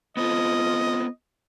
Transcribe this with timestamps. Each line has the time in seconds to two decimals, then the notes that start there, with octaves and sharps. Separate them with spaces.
0.17 B3 C4 F4 A4 D#5